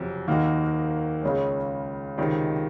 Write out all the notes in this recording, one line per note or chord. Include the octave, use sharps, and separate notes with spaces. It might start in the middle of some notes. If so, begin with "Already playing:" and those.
Already playing: F#1 F2 C3 F#3
D#2 D#3 A#3 D#4 F#4
C#2 C#3 G#3 C#4
C#2 C3 D#3